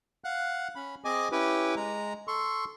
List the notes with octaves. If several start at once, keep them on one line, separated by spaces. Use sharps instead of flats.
F5 F#5 F#6
C#4 B5
C4 G#4 D#5 G#5 D6
C#4 E4 G4 B4
G#3 A#5
A4 C6 C#6